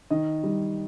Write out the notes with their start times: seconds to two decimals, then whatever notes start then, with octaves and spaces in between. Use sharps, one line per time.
0.10 D#3 D#5
0.43 G3